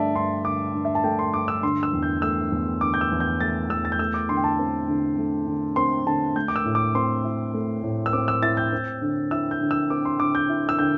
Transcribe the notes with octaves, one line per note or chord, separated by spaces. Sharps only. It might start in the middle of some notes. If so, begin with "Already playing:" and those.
Already playing: G2 D3 A3 D5 E5 A5
G2 C6
D3 D6
G2
E5
A5
A3 G5
C6
G2 D6
E6
D3 C6
E6
E2
G6
A3 E6
E2
D3 D6
G6
E6
E2
G6
A3 A6
E2 E6
A6
G6
A3 E6
D6
D3 C6
G5
A5
C4
D3
A3
D3
C4 C6
D3 A5
A3 G6
D6
E6
A2
D6
C4 C6
E4
A3
A2
E6
C4 D6
E6
E4 A6
G6
C4
D3
E4 E6
G6
D3
E6
C4 D6
C6
D3 D6
G6
E4
E6
D3 G6